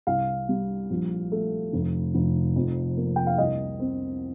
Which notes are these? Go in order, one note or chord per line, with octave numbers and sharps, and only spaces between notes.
C2 F5
G3
A#1
A3
F1
F1
F2
A#3
G5
F5
C2 D#5
C4